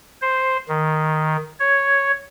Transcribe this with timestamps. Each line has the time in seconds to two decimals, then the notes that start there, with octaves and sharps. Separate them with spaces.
0.21 C5
0.68 D#3
1.60 C#5